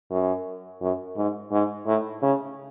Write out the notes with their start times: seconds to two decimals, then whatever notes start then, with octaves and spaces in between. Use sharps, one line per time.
0.11 F#2
0.81 F#2
1.17 G#2
1.52 G#2
1.86 A2
2.22 C#3